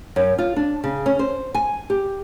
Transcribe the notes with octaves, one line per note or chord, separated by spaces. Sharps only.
F#2
F4
D4
C#3
C#4
C5
G#5
G4